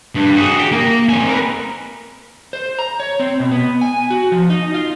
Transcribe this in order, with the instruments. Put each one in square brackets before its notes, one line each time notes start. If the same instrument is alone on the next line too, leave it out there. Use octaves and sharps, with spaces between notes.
[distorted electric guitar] G2
F#4 G#4
G4
A#3 F5
C4 G#5
A#4 B4
[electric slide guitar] C5
A#5
C#5
C4
B2
B3
G#5
F#4
F3
D#4
F4